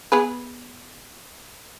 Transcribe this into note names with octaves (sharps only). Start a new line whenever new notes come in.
B3 G#4 B4